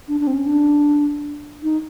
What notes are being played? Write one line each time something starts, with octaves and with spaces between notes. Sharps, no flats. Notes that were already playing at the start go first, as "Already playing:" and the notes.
D4
D4
C4
C#4
D4
D#4